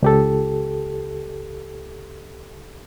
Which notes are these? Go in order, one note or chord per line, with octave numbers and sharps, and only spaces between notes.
C#2 G4 A4